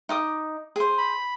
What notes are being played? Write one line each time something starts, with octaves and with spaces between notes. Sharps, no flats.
D#4 D6 D#6
G#4 C5
B5